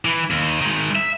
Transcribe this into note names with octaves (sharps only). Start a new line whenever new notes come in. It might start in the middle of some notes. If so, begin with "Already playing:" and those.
E3
D#2
D#3 G#3
E5